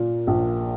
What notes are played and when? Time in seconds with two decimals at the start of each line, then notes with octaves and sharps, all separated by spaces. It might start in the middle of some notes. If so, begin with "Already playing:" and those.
Already playing: A#2 A#3
0.27 A#1